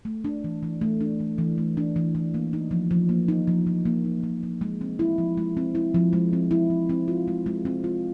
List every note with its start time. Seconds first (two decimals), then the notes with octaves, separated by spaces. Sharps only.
0.05 A3
0.24 D4
0.44 E3
0.63 E3
0.81 A3
1.01 D4
1.20 E3
1.38 E3
1.58 A3
1.77 D4
1.96 E3
2.15 E3
2.34 A#3
2.53 D#4
2.71 F3
2.91 F3
3.09 A#3
3.28 D#4
3.48 F3
3.67 F3
3.86 A#3
4.04 D#4
4.23 F3
4.43 F3
4.61 G#3
4.81 C4
4.99 E4
5.18 F3
5.38 G#3
5.57 C4
5.75 E4
5.94 F3
6.13 G#3
6.33 C4
6.51 E4
6.70 F3
6.89 C4
7.08 F4
7.28 G#3
7.46 G#3
7.65 C4
7.84 F4